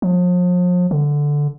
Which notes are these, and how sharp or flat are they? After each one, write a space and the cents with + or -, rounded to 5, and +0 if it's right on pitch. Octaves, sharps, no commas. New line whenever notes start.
F3 +40
D3 -5